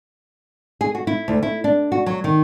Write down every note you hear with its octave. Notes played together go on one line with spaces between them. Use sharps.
G#4
F#4
E4
D2
E4
D4
F#4
F#3
D#3